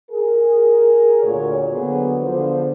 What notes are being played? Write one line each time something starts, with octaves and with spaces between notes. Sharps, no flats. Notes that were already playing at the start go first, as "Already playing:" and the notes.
G#4 A#4
D2 A#2 F#4 C#5
D3 F#3 B3 G#4 C5
D3 F3 B3 C5